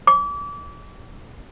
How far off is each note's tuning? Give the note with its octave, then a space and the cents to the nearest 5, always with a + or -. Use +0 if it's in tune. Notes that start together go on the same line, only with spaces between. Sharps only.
D6 -35